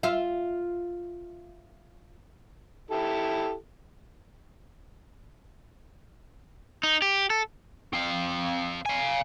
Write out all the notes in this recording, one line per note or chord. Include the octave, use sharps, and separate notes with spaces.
F4 E5 F5
E4 G4 A4
D#4
G4
A4
C4 F5
F5 G#5